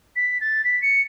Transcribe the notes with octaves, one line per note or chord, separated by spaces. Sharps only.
B6
A6
B6
C#7